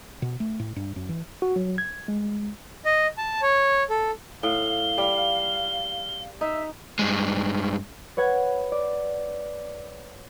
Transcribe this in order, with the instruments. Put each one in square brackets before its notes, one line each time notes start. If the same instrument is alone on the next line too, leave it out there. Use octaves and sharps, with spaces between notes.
[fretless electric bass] B2
A3
A2
G2
F#2
E3
[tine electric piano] F#4
F#3
G#6
G#3
[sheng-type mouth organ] D#5
A5
C#5
A4
[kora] A2 [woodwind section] F5 [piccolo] G7
[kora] G3
[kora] D#4 [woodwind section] E5
[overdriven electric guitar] G2 G#3
[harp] B4 C#5 F#5 G#6
D5